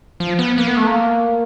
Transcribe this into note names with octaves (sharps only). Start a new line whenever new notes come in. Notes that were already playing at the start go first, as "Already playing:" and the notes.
F3
B3
A#3
B3
A3
A#3